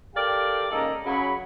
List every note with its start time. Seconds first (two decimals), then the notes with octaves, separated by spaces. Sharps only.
0.16 G4 A4 A#4 D5 F5 G5
0.71 G#2 C#3 A#3 A4 D#5 A#5
1.05 C#3 F#3 B5